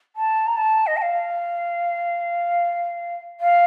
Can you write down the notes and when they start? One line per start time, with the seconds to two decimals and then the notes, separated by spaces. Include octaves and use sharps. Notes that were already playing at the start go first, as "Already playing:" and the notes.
0.16 A5
0.47 A#5
0.57 A5
0.87 D#5
0.97 A5
1.02 F5
3.40 F5